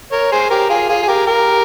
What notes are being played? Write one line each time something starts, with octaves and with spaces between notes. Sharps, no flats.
A#4 C#5
G#4 C5
G4 A#4
F4 G#4
F4 G#4
G#4
G4 A#4
G4 A#4